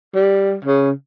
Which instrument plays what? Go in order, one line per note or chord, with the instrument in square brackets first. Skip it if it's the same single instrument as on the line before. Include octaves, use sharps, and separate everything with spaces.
[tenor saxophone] G3
C#3